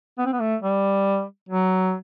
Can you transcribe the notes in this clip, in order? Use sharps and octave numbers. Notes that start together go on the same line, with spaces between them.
B3
C4
B3
A3
G3
F#3